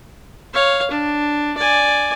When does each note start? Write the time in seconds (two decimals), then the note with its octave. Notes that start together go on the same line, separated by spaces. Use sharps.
0.54 C#5 F5
0.91 D4
1.58 D5 G#5